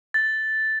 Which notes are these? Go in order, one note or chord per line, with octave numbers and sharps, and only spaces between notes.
A6